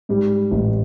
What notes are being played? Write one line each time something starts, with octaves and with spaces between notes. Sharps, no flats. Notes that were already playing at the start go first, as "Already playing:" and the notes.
G#2 G3
A1